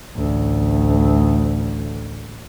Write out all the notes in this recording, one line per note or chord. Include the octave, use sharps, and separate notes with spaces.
A1 D2